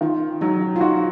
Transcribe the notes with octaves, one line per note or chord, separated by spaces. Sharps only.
D#3 F4
F#3 D#4
F4
D#4 F#4